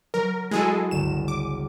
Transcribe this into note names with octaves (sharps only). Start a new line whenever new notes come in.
F#3 A#4
G#3 E4 F#4 G#4 A4
G1 C#2 E7
D6 D#7